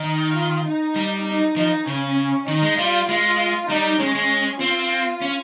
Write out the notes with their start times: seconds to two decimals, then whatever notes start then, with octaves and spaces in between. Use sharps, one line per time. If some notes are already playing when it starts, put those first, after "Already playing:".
Already playing: D#3 D#4
0.34 F4
0.65 D#4
0.96 G3
1.26 D#4
1.56 F3 D#4
1.87 C#3 C#4
2.48 D#3 D#4
2.63 G#3
2.78 G3 F4
3.09 G#3 F4
3.69 G3 D#4
4.00 G#3 C#4
4.15 G#3
4.60 C4 F4
5.22 C#4